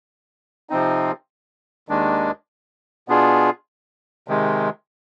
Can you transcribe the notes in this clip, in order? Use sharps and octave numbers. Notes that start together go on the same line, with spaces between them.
C3 F3 C4 D#4
D#2 D#3 G#3 D4
B2 B3 D4 F4 G#4
C3 D#3 G#3